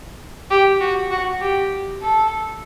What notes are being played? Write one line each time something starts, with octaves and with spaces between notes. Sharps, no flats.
G4
F#4
F#4
G4
A4